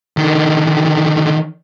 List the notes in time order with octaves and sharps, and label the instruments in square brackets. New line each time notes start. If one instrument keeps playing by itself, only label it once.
[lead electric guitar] D3 D#3